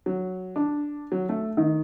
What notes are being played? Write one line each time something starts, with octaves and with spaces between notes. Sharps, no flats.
F#3
D4
F#3
A3
D#3